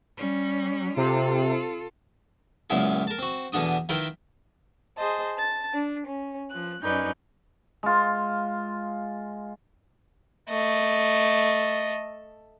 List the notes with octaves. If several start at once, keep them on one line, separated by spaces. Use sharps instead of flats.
G3 C#4
C3 F4 A4
C#2 F#2 A#2 B3 E4 F5
A#4 A5
C4 F#4
E2 B2 D3 D4 D#6
D#3 E4 F4 A#4 B4 G5
G#4 C5 D#5 A5
A5 A6
D4
C#4
F3 F#6
F#2 C#4 D#4 B4 D5 G6
G#3 F4
A3 D#5